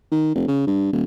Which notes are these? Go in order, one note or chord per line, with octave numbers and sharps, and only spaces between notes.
D#3
F1
C#3
G2
D#1